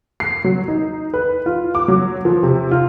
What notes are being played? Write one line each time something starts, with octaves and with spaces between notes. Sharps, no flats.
C7
F#3
D#4
B4
F4
D6
F#3
F3
C3
F4